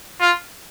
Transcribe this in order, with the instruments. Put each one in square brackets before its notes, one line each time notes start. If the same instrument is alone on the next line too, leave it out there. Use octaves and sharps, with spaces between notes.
[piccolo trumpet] F4